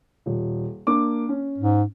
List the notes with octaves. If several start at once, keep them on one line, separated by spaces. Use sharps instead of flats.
D#1
A#3 D4 D6
C#4
G#2